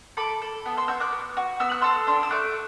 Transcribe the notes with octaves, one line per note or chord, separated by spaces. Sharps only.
A4 B5 D6
A4
B3
C6 E6
F#4 E6 G6
D6 F#6
B3
F#4
B3 E6
F#6
A4 C6 E6
D4 C6 E6
E6
A3 D6 F#6